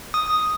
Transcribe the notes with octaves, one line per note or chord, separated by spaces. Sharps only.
D#6